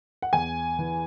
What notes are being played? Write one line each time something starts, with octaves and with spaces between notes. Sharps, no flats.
F#5
E2 G#5
E3